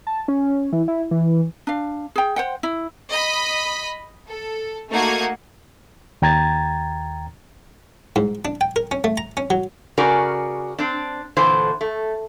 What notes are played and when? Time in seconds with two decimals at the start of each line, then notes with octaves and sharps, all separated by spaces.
0.07 A5
0.28 C#4
0.72 E3
0.88 E4
1.11 E3
1.67 D4 F5
2.16 G#4 G5
2.36 C5 F#5 G5
2.63 E4
3.10 D#5 B5
4.28 A4
4.90 A3 A#3 D#4 F#4 F#5 G#6
6.22 D#2 G5 A#5 G#6 A6
8.16 G#2
8.45 D4
8.61 G5
8.76 A#4
8.91 C#4
9.04 A3
9.17 A#5
9.37 C#4
9.50 F#3
9.97 C#3 C#4 F#4 G#4 A#4 D5
10.78 C4 D4
11.36 A#2 D3 E3 A3 C5
11.81 A3